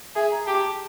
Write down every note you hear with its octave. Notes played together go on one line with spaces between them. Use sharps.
G#4 E5
A#5
G4 A5